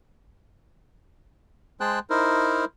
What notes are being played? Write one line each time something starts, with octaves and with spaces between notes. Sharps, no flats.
G#3 G#4 C5 G5 A5 F#6
D#4 E4 A#4 C5